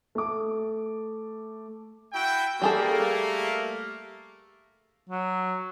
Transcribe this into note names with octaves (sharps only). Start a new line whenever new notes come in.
A3 A4 D6
E4 F#4 G5
G3 A3 A#3 G#4 A4
F#3